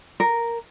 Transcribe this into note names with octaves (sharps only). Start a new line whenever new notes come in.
A#4